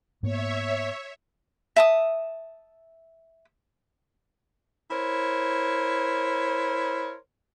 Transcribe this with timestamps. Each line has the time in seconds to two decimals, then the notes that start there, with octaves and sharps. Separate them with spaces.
0.23 G#2 A#3 B3 C#5 E5
1.76 E5 A5 D#6
4.91 E4 A#4 C5 C#5